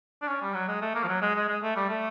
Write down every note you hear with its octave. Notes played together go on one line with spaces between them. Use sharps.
D4
C#4
G3
F#3
G#3
A3
A#3
F3
F#3
G#3
G#3
G#3
A3
G3
A3